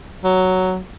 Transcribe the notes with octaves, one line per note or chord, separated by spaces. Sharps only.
F#3